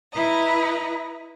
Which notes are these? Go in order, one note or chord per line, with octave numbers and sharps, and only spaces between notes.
E4 B4 D#5 A#5